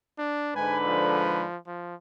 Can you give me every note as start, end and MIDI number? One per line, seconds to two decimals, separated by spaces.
0.18 0.56 62
0.56 1.44 44
0.56 1.44 50
0.56 1.44 71
0.56 0.78 80
0.86 1.57 53
1.67 1.95 53